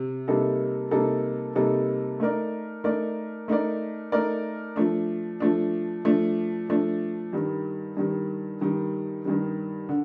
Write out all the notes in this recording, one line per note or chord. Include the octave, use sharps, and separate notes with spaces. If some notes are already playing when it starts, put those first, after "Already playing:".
Already playing: C3
C3 G3 A#3 D#4 A4
C3 G3 A#3 D#4 A4
C3 G3 A#3 D#4 A4
A3 D#4 A#4 D5
A3 D#4 A#4 D5
A3 D#4 A#4 D5
A3 D#4 A#4 D5
F3 A3 D4
F3 A3 D4
F3 A3 D4
F3 A3 D4
G2 D#3 G3
G2 D#3 G3
G2 D#3 G3
G2 D#3 G3
D3